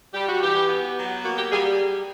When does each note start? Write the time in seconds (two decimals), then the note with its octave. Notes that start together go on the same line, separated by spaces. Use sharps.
0.14 G3 G4
0.28 F#4
0.42 E3 G4
0.69 B3
0.97 F#3
1.24 A#3 F#4
1.38 G4
1.52 G3 G#4